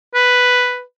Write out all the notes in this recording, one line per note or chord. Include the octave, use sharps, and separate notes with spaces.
B4